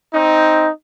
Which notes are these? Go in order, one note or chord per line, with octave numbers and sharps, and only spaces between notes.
C4 D#4